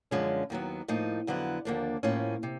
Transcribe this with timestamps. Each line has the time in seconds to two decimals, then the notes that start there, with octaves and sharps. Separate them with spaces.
0.11 F#2 D3 F3 G#3 C#4
0.50 D#2 D#3 F#3 B3
0.88 A2 F3 A#3 D#4
1.27 F2 D3 F#3 B3 E4
1.65 D#2 D3 F3 A#3 D4
2.03 A2 F3 A#3 C#4
2.43 C3